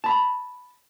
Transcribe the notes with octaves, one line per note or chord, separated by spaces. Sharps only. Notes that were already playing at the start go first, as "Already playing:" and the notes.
A5 B5